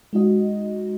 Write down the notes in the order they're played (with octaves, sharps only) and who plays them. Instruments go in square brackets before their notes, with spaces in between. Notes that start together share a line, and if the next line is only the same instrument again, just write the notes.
[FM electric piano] G#3 D#4 F#4 D#5